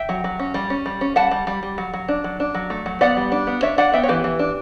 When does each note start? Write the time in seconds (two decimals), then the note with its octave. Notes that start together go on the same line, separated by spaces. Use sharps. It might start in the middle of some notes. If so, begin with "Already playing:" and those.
Already playing: E5 G5
0.09 F#3
0.24 F#3
0.39 C#4
0.54 G3
0.70 C#4
0.86 G3
1.01 C#4
1.16 G3 F#5 A5
1.31 G3
1.47 G3
1.63 G3
1.78 F#3
1.93 F#3
2.08 D4
2.24 F#3
2.40 D4
2.54 F#3
2.70 A3
2.86 F#3
3.01 B3 D5 F#5
3.17 G3
3.32 D4
3.47 B3
3.62 D4 C#5 E5
3.78 D4 D5 F#5
3.94 B3 E5 G5
4.03 C#5
4.08 E3 G4 B4
4.24 E3
4.39 D4